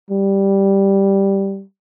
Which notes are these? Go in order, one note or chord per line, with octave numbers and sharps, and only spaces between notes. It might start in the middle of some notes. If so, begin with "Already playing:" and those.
G3